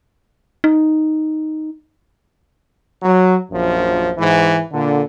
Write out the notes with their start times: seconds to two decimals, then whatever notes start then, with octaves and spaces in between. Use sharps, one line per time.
0.64 D#4
3.03 F#3
3.51 A#1 F#2 F3
4.18 G#2 E3
4.72 A#2 D3